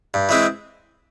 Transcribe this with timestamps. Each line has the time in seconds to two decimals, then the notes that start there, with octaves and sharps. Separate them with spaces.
0.14 G2
0.29 E3 G#3 C4 E4